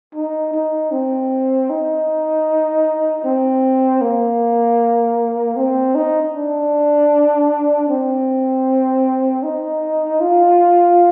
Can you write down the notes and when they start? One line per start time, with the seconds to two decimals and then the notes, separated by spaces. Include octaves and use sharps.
0.15 D#4
0.54 D#4
0.92 C4
1.70 D#4
3.24 C4
4.01 A#3
5.56 C4
5.95 D#4
6.33 D4
7.89 C4
9.43 D#4
10.21 F4